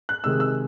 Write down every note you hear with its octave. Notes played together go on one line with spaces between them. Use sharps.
F#6
C3 D#3 G#3 D#4 E6
E6